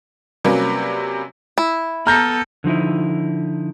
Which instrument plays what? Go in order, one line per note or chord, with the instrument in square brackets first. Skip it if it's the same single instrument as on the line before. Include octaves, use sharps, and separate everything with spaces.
[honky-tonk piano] C3 F#3 G3 A#3 C#4 B4
[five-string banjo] E4
[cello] B3 A4 [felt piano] A#5 [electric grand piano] F6 G6 A#6
[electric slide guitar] D3 F3 D#4 E4